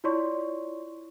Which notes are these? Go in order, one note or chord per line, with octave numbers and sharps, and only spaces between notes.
E4 F4 C#5 D5 C6 C#6